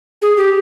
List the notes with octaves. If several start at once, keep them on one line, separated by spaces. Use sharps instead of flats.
G#4
G4